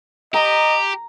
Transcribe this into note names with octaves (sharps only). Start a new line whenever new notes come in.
G4 D#5 A#5